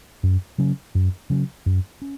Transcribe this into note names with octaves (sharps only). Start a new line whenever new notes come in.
F#2
C#3 F#3 C#4
F#2
C#3 F#3 C#4
F#2
C#4